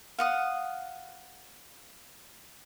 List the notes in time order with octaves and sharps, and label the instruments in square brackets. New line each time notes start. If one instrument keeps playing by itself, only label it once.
[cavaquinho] F5 F#5 D#6